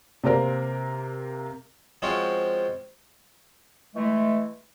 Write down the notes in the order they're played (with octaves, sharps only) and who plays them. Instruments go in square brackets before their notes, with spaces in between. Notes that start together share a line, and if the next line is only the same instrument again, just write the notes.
[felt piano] C3 A#3 C4 A#4
[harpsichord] F3 G#3 C4 C#4 F4 F#4
[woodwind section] E3 G#3 A3